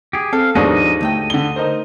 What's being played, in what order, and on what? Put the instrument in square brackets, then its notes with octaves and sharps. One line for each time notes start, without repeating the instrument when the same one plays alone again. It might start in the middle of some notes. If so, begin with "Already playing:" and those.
[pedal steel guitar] G4 G#4
[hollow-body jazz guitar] C4 [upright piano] A4 [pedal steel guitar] F5
[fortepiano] D#2 G#2 [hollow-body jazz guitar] F3 B3 D4 [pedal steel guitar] D#5
[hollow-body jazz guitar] D2 A3 G5
[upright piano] D3 G7
D#4 A#4 C5